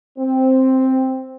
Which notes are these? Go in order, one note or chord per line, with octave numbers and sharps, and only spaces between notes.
C4